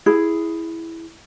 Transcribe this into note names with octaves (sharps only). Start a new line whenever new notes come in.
E4 G#4